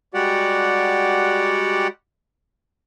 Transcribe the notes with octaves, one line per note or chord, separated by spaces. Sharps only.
G3 G#3 F#4 G4 D5 F#5